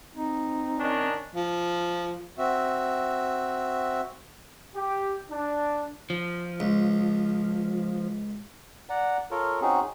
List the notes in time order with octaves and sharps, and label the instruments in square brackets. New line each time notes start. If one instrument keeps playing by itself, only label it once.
[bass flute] C4 [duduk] D#4
[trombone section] D#3 C#4 D4
[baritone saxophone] F3
[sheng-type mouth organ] C4 F#4 E5
[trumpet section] G4
D4
[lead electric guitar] F3
[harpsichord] C#2
[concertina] D5 F#5 A#5
F4 A4 A#4 C#5
C4 C#4 D#4 F#4 G#4